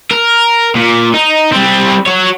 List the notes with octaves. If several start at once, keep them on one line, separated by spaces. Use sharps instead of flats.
A#4
A#2
D#4
G3 C4
F#4 C#5